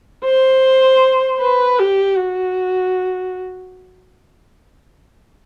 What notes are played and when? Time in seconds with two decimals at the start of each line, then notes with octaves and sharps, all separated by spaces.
0.25 C5
1.40 B4
1.79 G4
2.17 F#4